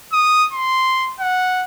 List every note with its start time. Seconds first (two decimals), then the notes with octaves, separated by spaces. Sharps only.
0.13 D#6
0.53 C6
1.20 F#5